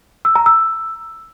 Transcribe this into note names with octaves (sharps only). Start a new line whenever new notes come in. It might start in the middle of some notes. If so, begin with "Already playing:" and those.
E6
A#5
E6